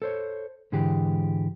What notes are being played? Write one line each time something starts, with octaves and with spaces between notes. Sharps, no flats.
A4 C5 C#5
G#2 D3 E3 G#3 G4